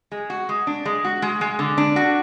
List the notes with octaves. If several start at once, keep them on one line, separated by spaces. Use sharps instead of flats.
G#3
F#4
G#3
D4
G#3
F#4
G#3
G#3
D3
D4
F#4